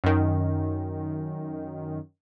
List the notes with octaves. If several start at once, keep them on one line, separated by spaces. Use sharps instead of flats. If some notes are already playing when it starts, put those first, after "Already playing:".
F#2 D#3